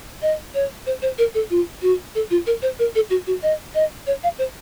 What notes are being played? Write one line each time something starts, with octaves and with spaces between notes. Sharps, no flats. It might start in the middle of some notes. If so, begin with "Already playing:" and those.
D#5
C#5
C5
C5
A#4
A4
F4
F#4
A4
F4
A#4
C5
A#4
A4
F#4
F#4
D#5
D#5
C#5
F5
C5